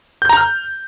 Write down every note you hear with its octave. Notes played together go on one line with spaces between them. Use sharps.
G6
A#5
F6